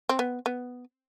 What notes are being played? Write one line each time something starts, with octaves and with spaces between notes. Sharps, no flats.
C4
B3
B3